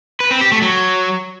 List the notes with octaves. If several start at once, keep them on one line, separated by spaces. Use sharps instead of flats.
B4
C4
G4
A3
F#3